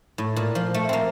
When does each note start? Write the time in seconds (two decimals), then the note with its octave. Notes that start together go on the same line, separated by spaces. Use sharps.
0.18 A2
0.36 A#2
0.55 F3
0.74 A3
0.89 A#3 C4